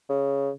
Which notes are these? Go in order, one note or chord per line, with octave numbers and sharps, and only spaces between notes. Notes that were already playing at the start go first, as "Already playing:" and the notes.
C#3